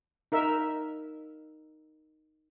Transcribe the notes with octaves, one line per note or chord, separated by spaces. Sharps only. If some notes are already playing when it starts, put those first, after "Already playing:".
D#4 A#4 E5